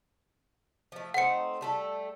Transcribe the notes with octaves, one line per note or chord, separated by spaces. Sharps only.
F3 A3
A3 C4 D#4 F#5 C#7
G3 A3 A4